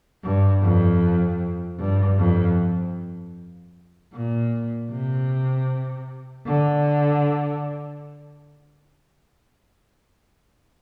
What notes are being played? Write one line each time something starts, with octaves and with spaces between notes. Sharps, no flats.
G2
F2
G2
F2
A#2
C3
D3